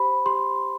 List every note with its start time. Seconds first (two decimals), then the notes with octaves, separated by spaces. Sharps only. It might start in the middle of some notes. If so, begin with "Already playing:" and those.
Already playing: G4 C5 B5
0.26 G4 C6